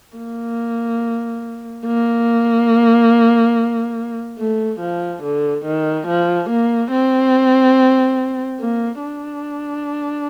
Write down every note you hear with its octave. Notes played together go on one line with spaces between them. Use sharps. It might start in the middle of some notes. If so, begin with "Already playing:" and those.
A#3
A#3
A3
F3
D3
D#3
F3
A#3
C4
A#3
D4